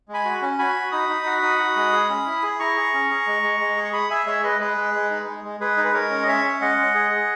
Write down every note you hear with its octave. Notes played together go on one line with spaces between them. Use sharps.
G#3
G#5 B5
F#4
C#4
F#4 G#5 B5
F#4
D#4 B5 D#6
D#4
F#4
D#4
F#4
G#3
G#4
C#4
E4
G#4
E4 A#5 C#6
G#4
C#4
G#4
G#3
G#3
G#3
G#4
C#6
G#4 B5 D#6
G#4 E5 G#5
G#3 C#5 E5
G#3 B4 D#5
G#3 G#4 B4
G#3
G#3
D#4
G#3
G#3
G#3 G#4 B4
D#4
B4
G#3 A#4 C#5
C#4
D#5
C#4 C#5 E5
C#4
G#3 D#5 F#5
G#3
G#4
G#4